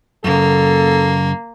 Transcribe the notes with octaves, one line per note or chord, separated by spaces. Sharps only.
F#2 C#3 A#3 A4